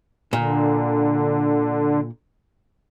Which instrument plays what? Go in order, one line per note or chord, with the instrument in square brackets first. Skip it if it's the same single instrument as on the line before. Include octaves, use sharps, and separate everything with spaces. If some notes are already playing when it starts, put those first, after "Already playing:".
[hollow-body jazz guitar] A#2 [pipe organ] D3